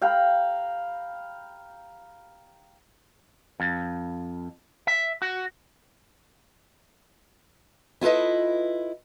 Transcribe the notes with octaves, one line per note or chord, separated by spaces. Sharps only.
F5 G5 A#5 B5
F2
E5
F#4
E4 F4 A4 B4 D#5